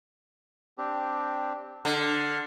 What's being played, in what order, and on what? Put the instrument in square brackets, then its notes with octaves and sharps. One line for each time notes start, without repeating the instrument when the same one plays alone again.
[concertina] C4 D4 G4
[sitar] D3 [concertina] C6 F6 F#6